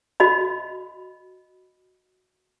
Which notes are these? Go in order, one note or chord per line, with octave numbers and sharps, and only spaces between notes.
F#4 D#5 B5